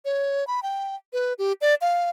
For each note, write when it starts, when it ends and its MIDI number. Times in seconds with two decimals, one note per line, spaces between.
0.05 0.46 73
0.47 0.63 83
0.63 0.95 79
1.13 1.33 71
1.39 1.53 67
1.61 1.75 74
1.81 2.10 77